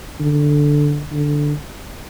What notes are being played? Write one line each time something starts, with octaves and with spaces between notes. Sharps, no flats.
D3
D3